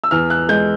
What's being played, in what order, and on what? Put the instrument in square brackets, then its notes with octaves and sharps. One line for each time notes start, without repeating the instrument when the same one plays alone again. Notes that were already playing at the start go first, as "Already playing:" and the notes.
[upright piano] E6
E2 F6
F#6
G#3 G6